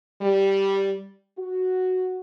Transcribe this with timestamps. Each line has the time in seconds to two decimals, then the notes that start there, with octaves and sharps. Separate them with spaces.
0.21 G3
1.38 F#4